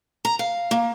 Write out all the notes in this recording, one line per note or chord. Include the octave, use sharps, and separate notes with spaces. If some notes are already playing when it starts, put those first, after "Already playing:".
A#5
F5
A#3